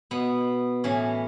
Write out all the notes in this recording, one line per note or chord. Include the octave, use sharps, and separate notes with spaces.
B2 B3
A2 E3 C#4